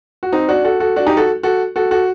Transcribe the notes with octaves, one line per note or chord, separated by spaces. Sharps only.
F#4
C4 D#4
D4 F#4
F#4 A4
F#4 A4
D4 F#4
D#4 G4
F#4 A4
F#4 A4
F#4 A4
F#4 A4